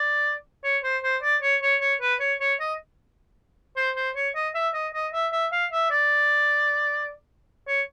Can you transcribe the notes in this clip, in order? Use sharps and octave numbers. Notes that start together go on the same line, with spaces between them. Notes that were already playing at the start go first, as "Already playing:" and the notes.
Already playing: D5
C#5
C5
C5
D5
C#5
C#5
C#5
B4
C#5
C#5
D#5
C5
C5
C#5
D#5
E5
D#5
D#5
E5
E5
F5
E5
D5
C#5